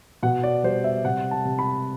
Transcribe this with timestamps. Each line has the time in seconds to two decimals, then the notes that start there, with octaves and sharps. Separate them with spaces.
0.23 B2 F#5
0.43 D5
0.63 G3 C5
0.84 E5
1.05 C3 F#5
1.31 A5
1.45 C3
1.59 B5